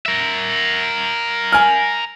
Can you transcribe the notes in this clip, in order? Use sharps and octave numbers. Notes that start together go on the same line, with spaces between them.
A#4 E5
G#5 F6